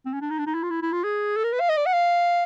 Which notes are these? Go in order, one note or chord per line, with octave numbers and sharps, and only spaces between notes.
C4
C#4
D4
D#4
D4
D#4
E4
F4
E4
E4
F4
G#4
A4
A#4
B4
F5
D#5
D5
F#5
F5